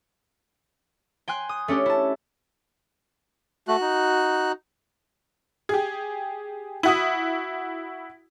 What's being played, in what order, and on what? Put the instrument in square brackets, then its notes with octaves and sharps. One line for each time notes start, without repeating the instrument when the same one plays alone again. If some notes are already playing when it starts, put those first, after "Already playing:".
[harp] G5 G#5 C6 F#6
D#6
A3 C#4 D4 G4
E4 A5
[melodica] A3 [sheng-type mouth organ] F#4 F#6
[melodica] D#4
[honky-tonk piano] G4 G#4
E4 F#4 D#6